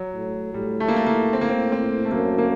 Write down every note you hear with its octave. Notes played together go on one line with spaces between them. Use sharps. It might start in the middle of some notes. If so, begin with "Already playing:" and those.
Already playing: F#3
A2
A2 G3
A3
A#3
A3
A#3
C4
A#3
C4
C4
A3
F#2 A#3
A#3